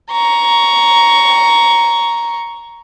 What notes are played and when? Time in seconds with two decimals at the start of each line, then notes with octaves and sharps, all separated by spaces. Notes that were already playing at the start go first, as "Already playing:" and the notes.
0.11 A#5 C#6